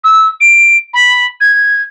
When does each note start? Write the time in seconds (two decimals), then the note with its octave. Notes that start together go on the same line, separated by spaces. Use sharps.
0.04 E6
0.41 D7
0.94 B5
1.41 G#6